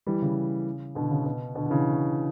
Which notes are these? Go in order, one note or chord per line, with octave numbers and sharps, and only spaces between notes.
E3 G3
C#3
B2 D3
C#3
B2
B2 D3
D3
C#3 E3